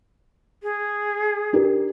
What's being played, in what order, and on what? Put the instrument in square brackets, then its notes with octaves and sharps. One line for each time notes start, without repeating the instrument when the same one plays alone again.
[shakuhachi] G#4
[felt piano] D4 G4 A#4